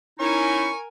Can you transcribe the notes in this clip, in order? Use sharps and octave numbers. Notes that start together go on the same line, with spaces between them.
C#4 D#4 E4 A#4 G#5 C#6